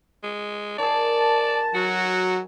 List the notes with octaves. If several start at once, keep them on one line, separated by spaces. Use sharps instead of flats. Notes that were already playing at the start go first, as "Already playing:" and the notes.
G#3
D#3 G#4 D5 A5
F#3 F#4